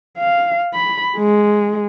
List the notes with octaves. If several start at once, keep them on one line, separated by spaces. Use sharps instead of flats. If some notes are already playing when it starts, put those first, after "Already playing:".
F5
B5
G#3